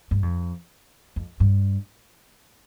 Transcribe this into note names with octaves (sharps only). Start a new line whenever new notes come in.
G2
F2
F2
G2